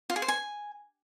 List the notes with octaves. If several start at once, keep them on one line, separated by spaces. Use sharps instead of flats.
F4
G#4
C5
G#5